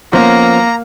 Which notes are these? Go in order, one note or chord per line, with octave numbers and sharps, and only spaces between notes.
F3 A#3 B3 C#4 A#5